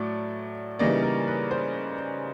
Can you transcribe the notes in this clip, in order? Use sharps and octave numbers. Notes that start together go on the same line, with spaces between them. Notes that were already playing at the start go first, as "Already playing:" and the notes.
Already playing: A2 F#3 A3 D5
C#3 E3 G3 A#3 D#4 D5
A#4
B4
C5